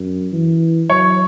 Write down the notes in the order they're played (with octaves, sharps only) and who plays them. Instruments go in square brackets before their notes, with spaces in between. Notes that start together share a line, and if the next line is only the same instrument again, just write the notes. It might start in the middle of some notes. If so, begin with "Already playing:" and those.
Already playing: [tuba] F#2
E3
[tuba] F#3 [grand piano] C#5